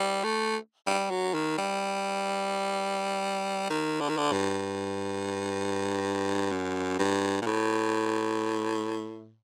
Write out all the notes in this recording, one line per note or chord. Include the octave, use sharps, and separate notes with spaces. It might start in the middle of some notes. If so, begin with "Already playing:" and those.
Already playing: G3
A3
G3
F#3
D#3
G3
D#3
D3
D#3
D3
G2
F#2
G2
A#2
A2